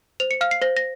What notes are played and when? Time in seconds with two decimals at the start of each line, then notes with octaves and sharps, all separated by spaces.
0.20 C5 F7
0.31 C#7
0.41 F5 F6
0.51 C7
0.62 C5 A#6
0.77 A#6